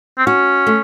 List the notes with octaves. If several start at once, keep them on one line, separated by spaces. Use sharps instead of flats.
C4
C#4 F#4
A3